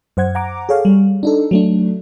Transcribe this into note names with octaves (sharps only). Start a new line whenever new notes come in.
F#2 C5 F#5 G#6
F#5 A#5 D6
G#4 A4 C#5 F5
G3
D4 D#4 A4
F#3 A3 D4